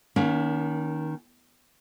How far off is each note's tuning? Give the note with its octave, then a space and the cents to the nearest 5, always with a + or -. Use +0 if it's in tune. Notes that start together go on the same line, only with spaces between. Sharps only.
D#3 +0 A#3 +30 C#4 +30